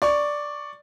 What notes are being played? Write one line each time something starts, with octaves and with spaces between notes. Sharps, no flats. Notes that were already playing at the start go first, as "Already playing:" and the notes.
D5 C#6